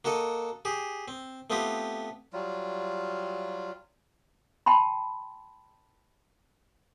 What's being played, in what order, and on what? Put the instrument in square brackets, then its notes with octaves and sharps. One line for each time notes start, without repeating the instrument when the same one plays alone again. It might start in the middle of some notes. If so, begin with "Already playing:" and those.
[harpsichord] A#3 F#4 A4 D#5
G4 G#4
C4
A3 B3 C4 F4 G4 D#6
[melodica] F#3 G3 F4
[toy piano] G5 A5 B5 C6